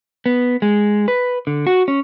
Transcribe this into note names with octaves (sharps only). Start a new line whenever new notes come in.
B3
G#3
B4
D3
F#4
C#4